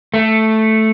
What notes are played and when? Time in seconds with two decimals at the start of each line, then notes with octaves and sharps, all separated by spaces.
0.14 A3